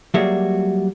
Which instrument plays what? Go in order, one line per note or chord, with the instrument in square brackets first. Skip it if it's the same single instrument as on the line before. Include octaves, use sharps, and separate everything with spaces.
[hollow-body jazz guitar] F#3 G3 A#3 F#4 G#4 E5